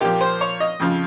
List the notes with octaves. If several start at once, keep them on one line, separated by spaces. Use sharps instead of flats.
A#2 F3 G4
C5
C#5
D#5
F2 C#3 F3